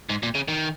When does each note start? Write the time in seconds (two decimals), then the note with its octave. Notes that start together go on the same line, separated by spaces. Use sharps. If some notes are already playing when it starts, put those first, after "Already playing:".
0.09 G#2
0.23 A#2
0.35 C#3
0.48 D#3